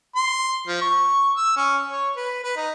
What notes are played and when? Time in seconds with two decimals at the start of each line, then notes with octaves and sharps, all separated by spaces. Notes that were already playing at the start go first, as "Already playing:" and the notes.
0.16 C6
0.68 F3
0.82 C#6
1.37 E6
1.57 C#4
1.90 C#5
2.17 B4
2.44 B4
2.56 D#4